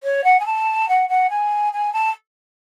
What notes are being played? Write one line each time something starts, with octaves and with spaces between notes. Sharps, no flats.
C#5
F#5
G#5
A5
F#5
F#5
G#5
G#5
A5